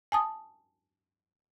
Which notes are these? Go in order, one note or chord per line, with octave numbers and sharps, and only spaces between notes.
G#5 A5 D#6